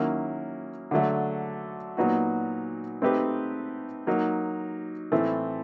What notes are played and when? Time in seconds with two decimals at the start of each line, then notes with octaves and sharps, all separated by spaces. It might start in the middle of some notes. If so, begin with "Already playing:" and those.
Already playing: D#3 F#3 A#3 C#4 E4
0.91 D3 F#3 A3
1.97 A#2 F#3 B3 D#4 F#4
3.02 A3 C4 D#4 G4 B4
4.07 F#3 A#3 D#4
5.12 A2 E3 A3 C4